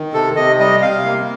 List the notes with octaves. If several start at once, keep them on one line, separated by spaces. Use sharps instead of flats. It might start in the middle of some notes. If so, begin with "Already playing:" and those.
Already playing: D#3
C3 A4
C3 D#5
G3 D#5
C3 F5
A#3